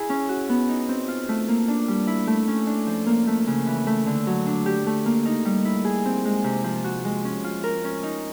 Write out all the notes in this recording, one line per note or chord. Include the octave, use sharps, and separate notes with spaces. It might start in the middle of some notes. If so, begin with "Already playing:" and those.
Already playing: E4 G#4
C#4
F#4
B3
D#4
C4
F4
A3
A#3
D4
G3
E4
A3
C#4
D4
F3
A#3
A3
C#3
E3
A3
D3
F#3
D4
G4
A3
A#3
D#4
G3
E4
G#4
C4
G#3
C3
F3
F#4
G#3
C#4
F4
A#4
C#4
D#4